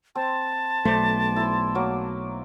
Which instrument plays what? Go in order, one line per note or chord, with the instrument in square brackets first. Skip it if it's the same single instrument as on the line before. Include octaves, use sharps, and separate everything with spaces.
[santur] C4 [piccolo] A5
[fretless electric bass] B1 A3 [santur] C5 D5
[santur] E4 C6
F#3 A#3 D5